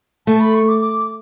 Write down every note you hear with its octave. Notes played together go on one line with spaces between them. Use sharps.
A3 A5
B5
C#6
D6
D6